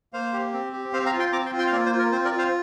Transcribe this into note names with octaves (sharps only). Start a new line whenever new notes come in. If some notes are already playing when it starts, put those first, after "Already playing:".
A#3 C5 F5
G4
C4
G4
C4 C5 F5
F5 A#5
F4
G5 C6
C4 A#5 D6
G5 C6
F4
G5 C6
F5
A#3 A#4 D5
C5
F4
A#4
C4 C5
A#4 D5
F4
C5 F5